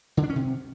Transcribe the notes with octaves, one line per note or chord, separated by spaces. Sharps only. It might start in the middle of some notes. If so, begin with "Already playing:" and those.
D3
D4
C#4
C3